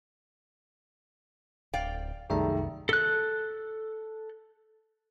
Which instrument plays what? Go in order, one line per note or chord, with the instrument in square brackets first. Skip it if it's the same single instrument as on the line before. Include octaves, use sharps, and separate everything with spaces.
[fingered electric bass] D1 [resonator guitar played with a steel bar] D5 F5 G5
[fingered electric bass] C2 F#2 [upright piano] D#3 G3 A3 [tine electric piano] G#4 E5 A#5
[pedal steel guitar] A4 F#6